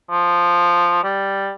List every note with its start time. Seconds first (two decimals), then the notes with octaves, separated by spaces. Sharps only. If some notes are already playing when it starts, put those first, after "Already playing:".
0.11 F3
1.03 G3